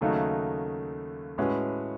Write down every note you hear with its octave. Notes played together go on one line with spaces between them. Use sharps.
D#2 C#3 F#3 A3 D#4
A2 G#3 C#4 F#4 B4